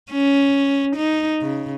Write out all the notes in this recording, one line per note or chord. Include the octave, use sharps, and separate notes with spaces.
C#4
D#4
C#3